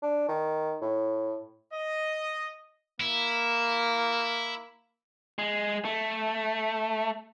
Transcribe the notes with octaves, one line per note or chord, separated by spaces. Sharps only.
D4
D#3
A2
D#5
A#3 E4
G#3
A3